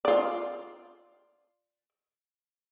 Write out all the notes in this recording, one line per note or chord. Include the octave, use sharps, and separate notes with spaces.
F4 D5